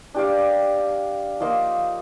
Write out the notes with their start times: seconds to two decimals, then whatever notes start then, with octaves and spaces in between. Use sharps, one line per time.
0.15 D4 G4 D5 F5
1.40 F3 A#3 D#4